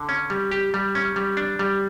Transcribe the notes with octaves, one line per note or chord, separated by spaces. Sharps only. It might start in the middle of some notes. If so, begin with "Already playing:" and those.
Already playing: D3
C#4
G3
G4
G3
C#4
G3
D4
G3